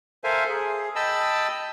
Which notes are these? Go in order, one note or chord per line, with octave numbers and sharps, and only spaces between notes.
A4 A#4 C5 E5 F5 G#5
G#4
D#5 G5 A5 B5 E6